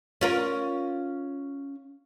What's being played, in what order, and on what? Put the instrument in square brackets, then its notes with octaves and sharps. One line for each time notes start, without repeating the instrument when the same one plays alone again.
[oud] C#4 F4 A#4